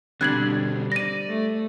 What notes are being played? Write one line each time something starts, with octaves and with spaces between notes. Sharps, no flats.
B2 D3 G3 C4 D4 F#6 G#6 F#7
D5 A#6 D#7
A3